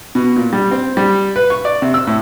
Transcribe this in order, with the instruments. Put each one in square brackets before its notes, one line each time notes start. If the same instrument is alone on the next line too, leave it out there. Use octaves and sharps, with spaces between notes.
[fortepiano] B2
A#2
G3
C4
G3
B4
C#6
D5
C3
E6
A2